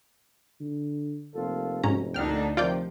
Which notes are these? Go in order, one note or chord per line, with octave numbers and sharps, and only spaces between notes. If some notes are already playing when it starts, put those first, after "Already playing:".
D3
F1 A#3 F4 A4
G#2 B2 C#4 A#5
D2 A#2 D3 D4 D#4 G5 F6
C3 D#3 F3 F4 D5 G5